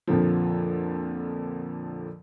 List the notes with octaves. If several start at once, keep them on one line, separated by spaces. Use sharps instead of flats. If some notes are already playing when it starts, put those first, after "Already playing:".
F2 A#2 D3 F3